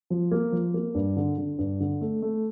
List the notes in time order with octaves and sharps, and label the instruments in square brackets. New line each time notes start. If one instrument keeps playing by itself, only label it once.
[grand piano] F3
A#3
F3
A#3
G2
D3
D3
G2
D3
A3
A3